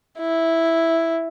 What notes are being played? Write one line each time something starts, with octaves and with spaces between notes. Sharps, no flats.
E4